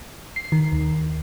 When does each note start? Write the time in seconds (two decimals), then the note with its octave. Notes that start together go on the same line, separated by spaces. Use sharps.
0.36 C7
0.52 D#3
0.72 D#2